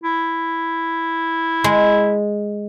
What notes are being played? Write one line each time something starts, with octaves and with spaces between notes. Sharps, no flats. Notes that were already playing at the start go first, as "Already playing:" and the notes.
E4
G#3